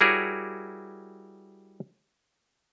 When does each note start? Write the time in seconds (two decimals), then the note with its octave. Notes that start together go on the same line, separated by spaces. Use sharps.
0.01 G3 E4 F#4 G#4 A#4 C#5